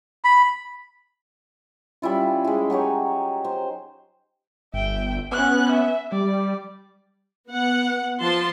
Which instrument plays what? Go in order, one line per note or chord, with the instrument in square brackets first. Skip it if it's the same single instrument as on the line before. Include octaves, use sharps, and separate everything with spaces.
[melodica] B5
[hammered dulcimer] G3 C#4 E4 F4
G#3 E4
F#3 D#4 G4 C#5
C5
[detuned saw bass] G1 [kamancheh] E5 G5
[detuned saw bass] B3 [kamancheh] C#4 F#6
[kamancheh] E5
[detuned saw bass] G3 [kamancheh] D5
[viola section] B3 F#5
F3 A5 C6